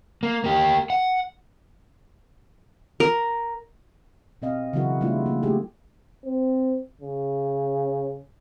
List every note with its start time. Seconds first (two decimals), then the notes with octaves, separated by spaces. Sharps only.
0.23 A#3
0.44 A#3 G4
0.90 F#5
3.00 A#4
4.42 B2 C4 D#5 F5
4.73 C#3 E3 F#3 E4 F#4 A#4
5.00 G3 A3 B3 D4 E4 F4
5.26 A#3 B3
5.43 A3 D#4 G4 G#4
6.25 C4
7.02 C#3